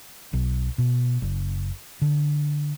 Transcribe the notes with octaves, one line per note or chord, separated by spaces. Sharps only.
B1
B2
F#1
D3